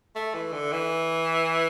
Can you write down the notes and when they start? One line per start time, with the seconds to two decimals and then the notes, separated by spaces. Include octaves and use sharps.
0.15 A3
0.34 E3
0.52 D3
0.72 E3